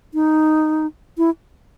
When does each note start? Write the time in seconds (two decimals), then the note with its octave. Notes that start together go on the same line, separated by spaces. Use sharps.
0.14 D#4
1.18 E4